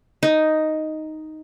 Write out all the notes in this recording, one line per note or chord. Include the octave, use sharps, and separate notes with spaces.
D#4